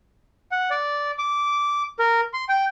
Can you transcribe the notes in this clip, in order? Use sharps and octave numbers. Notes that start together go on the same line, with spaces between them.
F#5
D5
D6
A#4
C6
G5